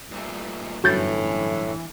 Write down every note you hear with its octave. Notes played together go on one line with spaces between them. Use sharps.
G2 A#2 A3
G1 F#2 A2 E3 F#4 G6 A6